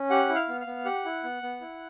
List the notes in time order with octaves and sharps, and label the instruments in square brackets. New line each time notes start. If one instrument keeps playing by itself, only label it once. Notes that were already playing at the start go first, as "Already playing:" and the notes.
Already playing: [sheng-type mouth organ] C#4
G4 F#5 F#6
E4
F5 F6
B3
F5 F6
B3
G4 F#5 F#6
E4
B3
B3
E4